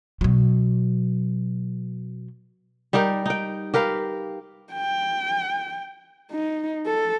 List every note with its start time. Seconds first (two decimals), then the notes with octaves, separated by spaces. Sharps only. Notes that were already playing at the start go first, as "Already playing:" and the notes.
0.21 B2 F#3
2.93 G3 D#4 G4 A#4
3.26 D#4 G5
3.74 G4 A#4 B4 F5
4.73 G5
6.31 D#4
6.86 A4